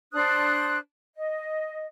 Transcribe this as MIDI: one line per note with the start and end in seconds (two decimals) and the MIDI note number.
0.13 0.77 62
0.13 0.77 72
0.13 0.77 87
0.13 0.77 90
1.15 1.85 75